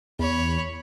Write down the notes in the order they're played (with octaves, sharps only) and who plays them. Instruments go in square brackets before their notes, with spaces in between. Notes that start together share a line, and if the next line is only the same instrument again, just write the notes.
[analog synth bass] E2 [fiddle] C#5 B5